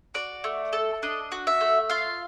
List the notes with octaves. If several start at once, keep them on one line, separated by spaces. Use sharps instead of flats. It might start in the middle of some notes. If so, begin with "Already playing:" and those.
F#4 D5
A3
A4
D4 D#5
F#4
E5
A3
F4 F5